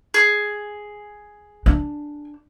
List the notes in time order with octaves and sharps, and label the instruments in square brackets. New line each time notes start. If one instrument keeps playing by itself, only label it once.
[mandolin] G#4
[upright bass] D4